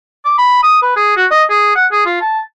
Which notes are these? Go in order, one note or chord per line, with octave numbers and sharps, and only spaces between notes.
D6
B5
D#6
B4
G#4
F#4
D#5
G#4
F#5
G#4
F4
A5